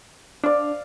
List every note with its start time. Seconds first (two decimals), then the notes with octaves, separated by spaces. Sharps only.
0.44 D4 D5 F5